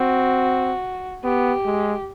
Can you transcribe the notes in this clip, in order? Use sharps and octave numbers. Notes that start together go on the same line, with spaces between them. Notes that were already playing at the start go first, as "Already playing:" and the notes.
Already playing: C4 F#4
B3 G4
G#3